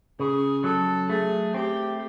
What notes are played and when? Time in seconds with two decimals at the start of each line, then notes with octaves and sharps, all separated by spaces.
0.19 C#3 G#4
0.64 F#3 A4
1.09 A3 G#4
1.54 C4 G4